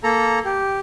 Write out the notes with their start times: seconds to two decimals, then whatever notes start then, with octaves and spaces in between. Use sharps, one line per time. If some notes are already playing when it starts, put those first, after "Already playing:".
0.03 A#3 A4 A#5
0.45 G4